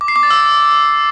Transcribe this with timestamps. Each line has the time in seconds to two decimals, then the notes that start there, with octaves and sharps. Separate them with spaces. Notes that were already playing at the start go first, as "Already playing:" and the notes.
0.01 D6
0.08 C7
0.16 D6
0.23 A6
0.31 E6